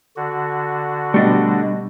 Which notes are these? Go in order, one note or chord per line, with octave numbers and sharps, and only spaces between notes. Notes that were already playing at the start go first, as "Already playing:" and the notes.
D3 F#4
B2 G3 A3 D4 D#5